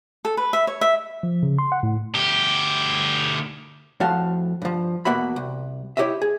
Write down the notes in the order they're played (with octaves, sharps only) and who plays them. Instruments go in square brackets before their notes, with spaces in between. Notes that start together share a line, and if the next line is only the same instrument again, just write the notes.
[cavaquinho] A4
B4
E5
C#5
E5
[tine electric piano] F3
C#3
C6
F#5
A2
[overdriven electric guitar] D2 G4
[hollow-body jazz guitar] F2 A2 F3 F#4 F5 A5
G2 F3
E2 B2 A#3 F#4 E5 B5
C2
E4 G4 C#5 D#5 E5
G#4